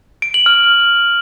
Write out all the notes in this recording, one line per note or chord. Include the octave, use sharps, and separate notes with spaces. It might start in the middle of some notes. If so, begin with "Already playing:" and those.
D7
F#7
F6